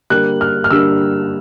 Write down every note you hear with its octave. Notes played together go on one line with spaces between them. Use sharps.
D3 G3 A#3 F#6
F6
F6
D3 G3 A#3 E6